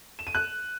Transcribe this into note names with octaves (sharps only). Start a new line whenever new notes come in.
E7
D#7
F#6